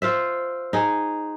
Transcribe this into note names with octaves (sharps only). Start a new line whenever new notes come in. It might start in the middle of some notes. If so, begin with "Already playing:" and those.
F4 C5 E5
D#4 G#4